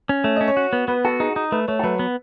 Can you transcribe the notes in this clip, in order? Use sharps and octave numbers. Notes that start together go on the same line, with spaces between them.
C#4
A3 C#5
C#4 D#5
C#5
F#4
B3
B3 B4
F#4 A4
D#4 G#4
D#4
A3 B4
A3 C#5
A4
F#3 B4
B3